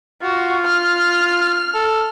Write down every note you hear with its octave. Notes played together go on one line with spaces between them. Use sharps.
F4 F#4
F6
A4